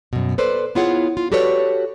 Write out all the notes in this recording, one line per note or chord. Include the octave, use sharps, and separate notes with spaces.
F#2 B2
A4 B4 C5 D5
B3 E4 F4 G#4 C#5 F#5
F4
F#4 G4 A4 B4 C#5 D5